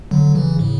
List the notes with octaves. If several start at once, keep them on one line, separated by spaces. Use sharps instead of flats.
D3 F#3
C#3 E3
A2 C#3